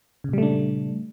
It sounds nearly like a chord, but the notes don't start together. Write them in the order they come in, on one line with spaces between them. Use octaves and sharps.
C#3 A#2 G3 A3 D4